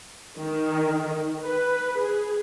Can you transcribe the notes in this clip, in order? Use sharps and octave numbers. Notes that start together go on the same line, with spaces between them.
D#3
B4
G#4